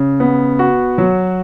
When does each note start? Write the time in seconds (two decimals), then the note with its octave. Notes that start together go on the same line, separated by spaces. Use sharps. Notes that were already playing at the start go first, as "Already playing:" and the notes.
Already playing: C#3
0.20 B3
0.59 F#4
0.98 F#3